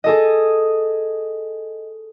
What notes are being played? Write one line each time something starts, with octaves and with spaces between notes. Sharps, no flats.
G#4 A4 D#5